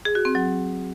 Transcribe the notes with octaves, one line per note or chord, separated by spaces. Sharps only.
G#4
F#4
C4
F#3